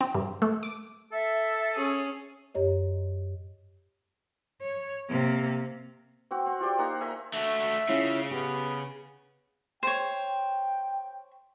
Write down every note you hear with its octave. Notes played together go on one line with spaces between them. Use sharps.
C4
G2
A3
D6
A4 E5
C#4 G#4
F#2 G4 C#5 D#5
C#5
C3 A#3
C4 F#4
C4
F4 G4 C5 D5
A#3 D#4 F#5 A#5
C5 E5 G#5 A#5
A3 F#4 E5
C#3 C#4 E4 F4
B3 G4
C5 C#5 G5